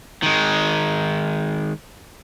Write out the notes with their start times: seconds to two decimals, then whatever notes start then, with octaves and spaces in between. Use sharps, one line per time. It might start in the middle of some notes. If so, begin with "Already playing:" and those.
0.23 D#3 G#3